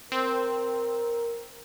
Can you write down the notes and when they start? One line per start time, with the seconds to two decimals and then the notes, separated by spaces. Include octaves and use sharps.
0.12 C4 A#4